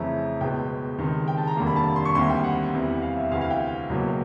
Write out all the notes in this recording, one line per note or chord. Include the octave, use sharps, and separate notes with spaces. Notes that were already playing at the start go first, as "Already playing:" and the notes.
Already playing: F2 C#3 E3 A3 A#5
C#2 B2 G#3 G5
C#2 C3 D#3 G#3
G5
A5
A#5
F1 D#2 D3 G3 A#3
B5
A5
C6
C#6
D2 C3 D#3 G3 A#3 C6
G5
F#5
E2 C3 E3 G3
F5
E5
D2 C3 E3 F5
F5
G5
C#2 B2 F#3 A#3